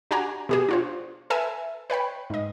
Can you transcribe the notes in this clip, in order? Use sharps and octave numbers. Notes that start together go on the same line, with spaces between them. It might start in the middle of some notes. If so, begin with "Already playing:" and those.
D4 F#4 G4 G#5 A#5
B2 G4 G#4
D4 F4 C5
A4 B4 E5 G#5 A5
B4 C#5 G5 B5
G#2 D#5